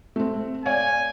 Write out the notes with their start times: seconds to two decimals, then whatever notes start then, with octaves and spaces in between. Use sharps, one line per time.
0.16 A3 C4
0.66 C#5 D5 F5 G#5